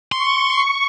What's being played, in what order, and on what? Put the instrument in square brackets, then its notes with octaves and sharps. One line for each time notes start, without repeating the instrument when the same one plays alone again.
[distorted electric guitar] C6 [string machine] C#6